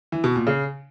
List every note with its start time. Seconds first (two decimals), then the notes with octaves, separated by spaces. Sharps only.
0.12 E3
0.24 B2
0.36 A#2
0.47 C#3